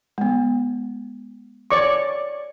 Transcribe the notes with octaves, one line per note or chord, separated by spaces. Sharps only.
G#3 B3
C#5 D5 C#6 D6